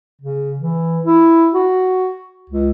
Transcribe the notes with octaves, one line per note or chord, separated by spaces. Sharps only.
C#3
E3
E4
F#4
C#2